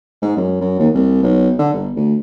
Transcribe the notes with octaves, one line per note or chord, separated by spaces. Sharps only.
G#2
F#2
F#2
D#2
C2
B1
D3
G1
D2